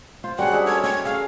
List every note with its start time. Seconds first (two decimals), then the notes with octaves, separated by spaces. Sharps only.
0.24 F4 C5
0.39 G3 C#4 F#4 G#4 A#4 F#5
0.53 G#3 D4 E5
0.66 A3 A#4 C#5 G#6
0.84 C#4 G4 G#6
1.05 G#4 F5